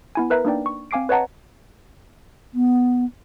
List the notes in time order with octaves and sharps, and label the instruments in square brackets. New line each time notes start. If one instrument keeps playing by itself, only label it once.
[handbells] B3 E4 G#5
A#4 B4 E5 A#5
A#3 D4 D#4 D5 G5
C#6
C4 F5 G#5 D6 C7 D7
B4 C#5 D#5 F#5 A5 A#5
[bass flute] B3